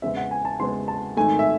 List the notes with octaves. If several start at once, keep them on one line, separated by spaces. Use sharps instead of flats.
E2 C#3 G#3 C4 E5
F#5
G#5
A5
E2 C#3 G#3 C4 C6
A5
G#1 G#2 D#3 A3 G#5
E5